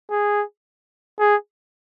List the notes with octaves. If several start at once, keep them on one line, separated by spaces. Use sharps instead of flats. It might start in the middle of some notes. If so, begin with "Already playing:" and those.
G#4
G#4